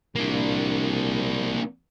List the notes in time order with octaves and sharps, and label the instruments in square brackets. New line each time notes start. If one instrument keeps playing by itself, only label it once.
[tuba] C2 [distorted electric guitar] A#3 D4